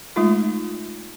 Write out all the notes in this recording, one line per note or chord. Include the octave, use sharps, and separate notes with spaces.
G#3 A3 D#4 F4